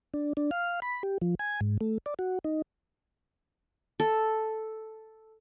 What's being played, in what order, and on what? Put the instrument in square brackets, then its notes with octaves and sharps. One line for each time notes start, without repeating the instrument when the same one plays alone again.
[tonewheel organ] D4
D4
F5
B5
G4
F3
G#5
G#2
A3
D5
F#4
D#4
[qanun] A4